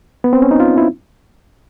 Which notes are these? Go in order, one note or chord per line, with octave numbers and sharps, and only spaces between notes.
B3
C4
C#4
D#4
F4
E4